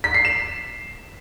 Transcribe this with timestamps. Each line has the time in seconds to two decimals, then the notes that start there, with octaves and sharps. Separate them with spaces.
0.04 B6
0.14 C7
0.25 E7